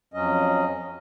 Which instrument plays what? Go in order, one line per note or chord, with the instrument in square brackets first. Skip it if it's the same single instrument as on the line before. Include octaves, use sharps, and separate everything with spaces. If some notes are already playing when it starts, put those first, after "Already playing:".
[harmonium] F2 F#3 C#4 D#5